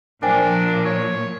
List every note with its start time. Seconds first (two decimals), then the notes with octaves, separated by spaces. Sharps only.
0.23 A#2 F3 D4 A#4 C5 G5 G#5
0.86 C#5